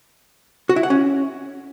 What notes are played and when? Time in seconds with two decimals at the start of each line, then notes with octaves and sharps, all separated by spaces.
0.69 F#4
0.76 E4
0.83 F#5
0.90 C#4